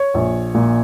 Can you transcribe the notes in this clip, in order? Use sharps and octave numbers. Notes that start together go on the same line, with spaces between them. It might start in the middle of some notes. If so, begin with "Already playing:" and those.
Already playing: C#5
A#1
A#2